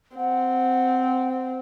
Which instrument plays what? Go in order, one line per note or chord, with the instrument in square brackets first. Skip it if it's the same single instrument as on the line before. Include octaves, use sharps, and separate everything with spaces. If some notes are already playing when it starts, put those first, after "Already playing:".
[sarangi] C4 [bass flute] F#5